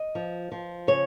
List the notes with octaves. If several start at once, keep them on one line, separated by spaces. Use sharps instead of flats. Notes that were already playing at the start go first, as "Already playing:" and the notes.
Already playing: D#5
F3
F3
C#3 C#5